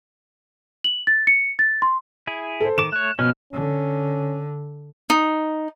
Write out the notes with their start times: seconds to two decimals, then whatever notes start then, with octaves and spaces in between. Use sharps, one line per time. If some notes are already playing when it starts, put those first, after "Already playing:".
0.84 F#7
1.07 A6
1.27 C#7
1.59 A6
1.82 C6
2.27 E4 G#4
2.60 A4 C5
2.78 D#3 D6 E7
2.92 A3 C#5 F#6
3.19 B2 F3 B3 C#4 F6
3.53 D3 C#4
5.10 D#4